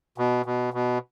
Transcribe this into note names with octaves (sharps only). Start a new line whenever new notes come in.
B2
B2
B2